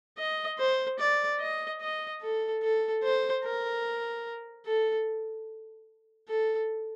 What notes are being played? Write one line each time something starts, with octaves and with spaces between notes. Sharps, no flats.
D#5
C5
D5
D#5
D#5
A4
A4
C5
A#4
A4
A4